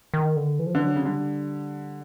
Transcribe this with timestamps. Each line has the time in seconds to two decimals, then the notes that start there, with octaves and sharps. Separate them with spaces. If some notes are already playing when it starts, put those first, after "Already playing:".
0.14 D#3
0.36 D3
0.59 E3
0.66 F3
0.74 D3 E3
0.83 F#3
0.96 C#3
1.05 D3 G3